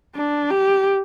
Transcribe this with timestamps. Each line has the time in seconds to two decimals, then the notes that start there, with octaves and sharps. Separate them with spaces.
0.15 D4
0.50 G4